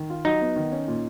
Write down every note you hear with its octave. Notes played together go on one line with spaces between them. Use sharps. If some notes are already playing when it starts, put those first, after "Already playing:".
Already playing: D#3
F4
F#3 D#4
B3
D#3
C#4
A#2